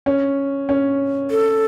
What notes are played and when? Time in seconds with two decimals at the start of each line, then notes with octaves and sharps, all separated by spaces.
0.06 C#4
0.69 C#4
1.30 A4